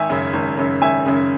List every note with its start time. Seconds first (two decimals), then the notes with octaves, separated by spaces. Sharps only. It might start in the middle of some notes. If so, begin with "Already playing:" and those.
Already playing: G#1 E5 G#5
0.10 F#2 C#3
0.33 G#1
0.57 F#2 C#3
0.82 G#1 E5 G#5
1.06 F#2 C#3